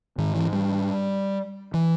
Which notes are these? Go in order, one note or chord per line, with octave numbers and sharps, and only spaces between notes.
G#2 D#3
E3
G3
E3